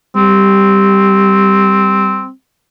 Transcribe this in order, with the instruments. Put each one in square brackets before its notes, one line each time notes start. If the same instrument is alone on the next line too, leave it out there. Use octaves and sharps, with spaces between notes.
[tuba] G3 [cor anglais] C4